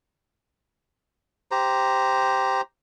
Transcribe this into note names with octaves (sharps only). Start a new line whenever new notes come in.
G4 C5 A#5